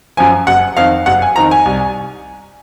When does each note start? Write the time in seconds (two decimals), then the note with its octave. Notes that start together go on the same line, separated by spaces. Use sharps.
0.17 F#2 F3 G#5
0.47 F#1 F#5
0.77 F2 D#3 F5
1.06 F#1 F#5
1.22 G#5
1.36 F2 D#3 A#5
1.51 G#5
1.65 C2